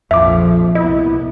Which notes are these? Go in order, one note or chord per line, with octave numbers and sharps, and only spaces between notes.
A#1 F2 F3 E5 D6
C2 A#3 B3 E4 D#5